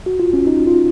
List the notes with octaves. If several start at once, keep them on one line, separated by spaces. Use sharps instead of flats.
F#4
F4
C#4
D#4
F4